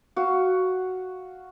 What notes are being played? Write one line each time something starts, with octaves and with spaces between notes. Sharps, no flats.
F#4 F5